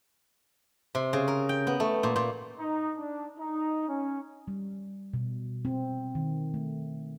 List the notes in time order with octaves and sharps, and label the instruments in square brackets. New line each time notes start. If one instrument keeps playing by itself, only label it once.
[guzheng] C3
C#3
A#4
G5
B3
A3
A#2
A#2
[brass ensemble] D#4
D4
D#4
C#4
[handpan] G3
B2
C4
D#3
A3